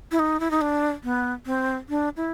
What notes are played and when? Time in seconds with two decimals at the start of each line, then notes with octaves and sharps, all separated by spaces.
0.12 E4
0.19 D#4
0.40 E4
0.51 D#4
0.61 D4
1.04 B3
1.46 C4
1.89 D4
2.17 E4